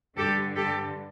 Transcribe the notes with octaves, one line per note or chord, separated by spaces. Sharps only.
G2 D3 G4 A4
G4 A4